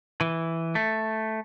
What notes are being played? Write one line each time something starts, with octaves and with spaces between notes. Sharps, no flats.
E3
A3